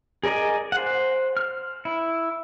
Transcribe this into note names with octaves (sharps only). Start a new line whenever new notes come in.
G#4 A#4 D5 D#5 G#5
C5 F#5
F6
E4